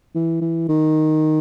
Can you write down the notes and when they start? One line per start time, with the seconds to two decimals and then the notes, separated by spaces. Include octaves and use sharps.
0.15 E3
0.41 E3
0.69 D#3